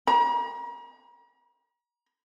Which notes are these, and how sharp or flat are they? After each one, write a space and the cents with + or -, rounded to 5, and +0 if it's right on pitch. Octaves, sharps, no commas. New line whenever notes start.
A#5 +40